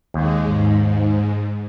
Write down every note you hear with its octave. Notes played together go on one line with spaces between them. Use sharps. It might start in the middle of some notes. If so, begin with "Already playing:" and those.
D#2 G#3
G#2